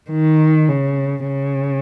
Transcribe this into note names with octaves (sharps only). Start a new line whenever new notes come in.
D#3
C#3
C#3